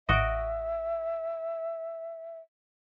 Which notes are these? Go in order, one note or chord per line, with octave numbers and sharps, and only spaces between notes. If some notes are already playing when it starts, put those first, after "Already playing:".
A1 F#4 D#5 E5 D7